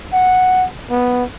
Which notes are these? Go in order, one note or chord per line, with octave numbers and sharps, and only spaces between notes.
F#5
B3